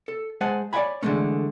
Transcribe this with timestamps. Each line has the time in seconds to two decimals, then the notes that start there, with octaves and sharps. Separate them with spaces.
0.08 A4
0.41 G#3 C5 F#5 G#5 A5
0.73 C#5 D5 E5 F#5 G#5 B5
1.03 D3 E3 G#3 A3 C#4